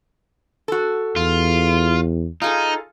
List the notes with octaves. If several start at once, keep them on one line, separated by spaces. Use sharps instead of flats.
F#4 A4
E2 F4
D#4 F4 G#4 A4